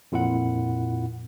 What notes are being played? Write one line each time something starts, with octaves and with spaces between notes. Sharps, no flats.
F2 A#2 E4 F4 F#5